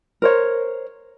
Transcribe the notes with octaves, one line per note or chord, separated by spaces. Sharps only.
A#4 C5 C#5